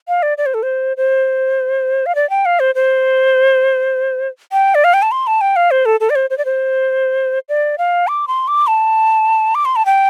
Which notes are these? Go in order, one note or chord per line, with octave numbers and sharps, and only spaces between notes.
F5
D5
D5
C5
A4
C5
C5
F5
D5
G5
F5
C5
C5
G5
D5
F5
G5
A5
C6
A5
G5
F5
C5
A4
A4
D5
C5
C5
D5
C5
D5
F5
D6
C6
D6
A5
D6
C6
A5
G5